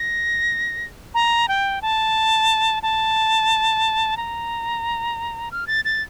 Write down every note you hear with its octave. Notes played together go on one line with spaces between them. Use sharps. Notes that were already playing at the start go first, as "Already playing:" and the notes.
Already playing: A#6
A#5
G5
A5
A5
A#5
F6
A6
A6